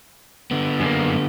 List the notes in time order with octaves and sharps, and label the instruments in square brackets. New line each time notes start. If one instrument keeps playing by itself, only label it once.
[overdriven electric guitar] D3 B3
[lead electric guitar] F#2 A#3